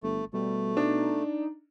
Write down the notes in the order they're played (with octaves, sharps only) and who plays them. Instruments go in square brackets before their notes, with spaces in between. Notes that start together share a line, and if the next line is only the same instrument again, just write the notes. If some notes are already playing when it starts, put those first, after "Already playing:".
[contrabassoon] G1 [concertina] A3
[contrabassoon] B2 [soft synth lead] G3 [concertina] A3
[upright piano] D4 [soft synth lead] D#4